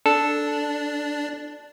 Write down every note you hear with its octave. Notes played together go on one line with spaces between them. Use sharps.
D4 A4